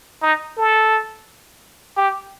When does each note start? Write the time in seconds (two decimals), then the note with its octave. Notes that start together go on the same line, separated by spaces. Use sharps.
0.22 D#4
0.57 A4
1.97 G4